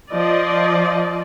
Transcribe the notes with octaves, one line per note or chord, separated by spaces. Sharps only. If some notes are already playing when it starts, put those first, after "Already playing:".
F3 D5 D#5